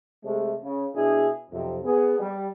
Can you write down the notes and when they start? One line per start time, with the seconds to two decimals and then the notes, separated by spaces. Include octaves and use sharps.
0.24 C3 G#3 A3
0.63 C#3
0.94 B2 D4 E4 G#4
1.51 B1 F2 C3
1.85 B3 G#4
2.19 G3